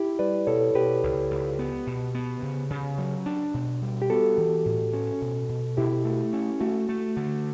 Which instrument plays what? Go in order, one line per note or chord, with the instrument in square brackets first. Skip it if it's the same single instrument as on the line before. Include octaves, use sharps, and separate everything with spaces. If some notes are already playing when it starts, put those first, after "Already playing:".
Already playing: [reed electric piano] E4 G4
[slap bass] G3 [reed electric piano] B4 D5
[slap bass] B2 [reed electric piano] A4 C#5
[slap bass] B2 [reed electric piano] G4 B4
[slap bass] C#2
C#2
B3
B2
B3
C#3
C#3
F#3
D4
B2
G3
[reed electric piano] G4
[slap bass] B3 [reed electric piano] F#4 A4
[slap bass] E3
A2
C#4
B2
B2
[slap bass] B2 [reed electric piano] E4 G4
[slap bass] A3
C#4
[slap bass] A3 [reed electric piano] F#4
[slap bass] A3
D3